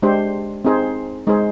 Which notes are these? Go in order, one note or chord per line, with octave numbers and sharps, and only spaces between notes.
G#3 D4 G4 C5
C4 D#4 G#4 C5
G#3 D#4 G#4 C5